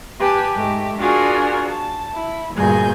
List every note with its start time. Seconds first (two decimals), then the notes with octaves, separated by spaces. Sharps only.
0.19 G4 B4 G#5 A5
0.54 G#2 A3 G4
0.97 D4 F4 F#4 G#4 A#4
1.68 A5
2.15 E4
2.54 D2 G2 A#2 G#4 G#5 G6